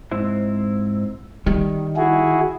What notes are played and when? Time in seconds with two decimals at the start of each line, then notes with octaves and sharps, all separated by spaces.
0.11 G#2 C4 E4
1.46 D#3 G3
1.96 E4 F#4 G#4